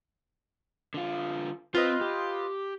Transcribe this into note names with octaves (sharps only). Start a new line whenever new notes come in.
D3 F4
C4 F4 B4 C5 D#5
G4